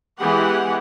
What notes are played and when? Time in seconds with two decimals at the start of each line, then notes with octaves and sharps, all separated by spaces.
0.19 E3 G#3 B3 G4 G#4 F#5